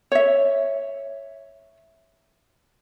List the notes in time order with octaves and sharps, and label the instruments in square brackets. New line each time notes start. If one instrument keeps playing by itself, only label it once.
[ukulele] C#5 E5